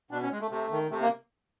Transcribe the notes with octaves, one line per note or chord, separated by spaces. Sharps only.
B2 D4
C#4
G#3
A3
C3 A3
D#3
C3 A3
A#3